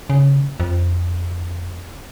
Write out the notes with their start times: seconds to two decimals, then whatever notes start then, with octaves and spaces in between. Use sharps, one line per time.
0.10 C#3
0.60 F2